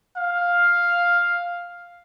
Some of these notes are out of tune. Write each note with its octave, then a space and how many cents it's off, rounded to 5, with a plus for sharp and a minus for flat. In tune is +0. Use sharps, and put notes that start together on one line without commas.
F5 +5